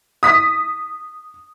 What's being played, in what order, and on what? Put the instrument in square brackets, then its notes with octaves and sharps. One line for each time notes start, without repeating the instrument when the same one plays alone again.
[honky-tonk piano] D#6 B6